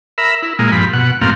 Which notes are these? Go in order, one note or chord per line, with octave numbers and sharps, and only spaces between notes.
A#4 E5 B5
E4
A#2 G#3 A#3
G2 F3 B5
B2 F#5
F#2 A2 A#3 C4 F5